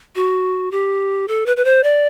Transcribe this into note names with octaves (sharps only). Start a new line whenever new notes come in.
F#4
G4
A4
B4
B4
C5
D5